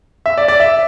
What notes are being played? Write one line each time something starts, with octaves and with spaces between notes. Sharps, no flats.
E5
D5
D5
E5